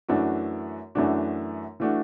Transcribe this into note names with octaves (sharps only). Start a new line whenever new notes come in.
F#2 E3 A3 D4 F#4
F#2 E3 A3 D4 F#4
E3 A3 D4 F#4